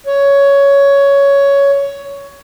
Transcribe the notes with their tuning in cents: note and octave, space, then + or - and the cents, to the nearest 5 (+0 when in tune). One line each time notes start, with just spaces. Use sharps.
C#5 +10